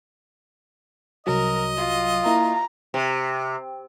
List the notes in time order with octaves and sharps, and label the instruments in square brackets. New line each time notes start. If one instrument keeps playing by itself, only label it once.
[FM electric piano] C2 F#3 [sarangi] A#4 [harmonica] D#5
[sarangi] F4
[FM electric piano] A#3 E4 [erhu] A#5
[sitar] C3